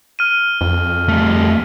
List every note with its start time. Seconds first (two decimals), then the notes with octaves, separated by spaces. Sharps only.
0.19 F6 D#7
0.61 F2
1.09 G3 A3